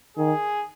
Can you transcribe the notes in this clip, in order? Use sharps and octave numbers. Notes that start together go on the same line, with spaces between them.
D#3 G#4